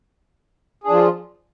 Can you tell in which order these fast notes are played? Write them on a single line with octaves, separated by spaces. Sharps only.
G#4 D4 F3 F4